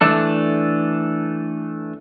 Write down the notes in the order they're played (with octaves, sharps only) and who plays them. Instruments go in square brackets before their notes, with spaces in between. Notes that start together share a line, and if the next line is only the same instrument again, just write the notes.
[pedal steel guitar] E3 A3 D4 A4